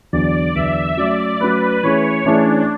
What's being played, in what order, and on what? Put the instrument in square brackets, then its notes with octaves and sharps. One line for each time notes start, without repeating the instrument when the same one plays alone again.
[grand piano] E2 D3 F#3 B3 [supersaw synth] D5
[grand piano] E2 D3 F#3 B3 [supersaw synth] E5
[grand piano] F#3 A3 C#4 F#4 [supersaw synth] D5
[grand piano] F#3 A3 C#4 F#4 [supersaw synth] B4
[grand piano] E3 A3 C#4 G#4 [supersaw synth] C#5
[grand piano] E3 A3 C#4 G#4 [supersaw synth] D4